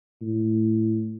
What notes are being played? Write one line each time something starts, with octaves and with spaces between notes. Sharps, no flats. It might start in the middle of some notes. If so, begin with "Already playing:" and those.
A2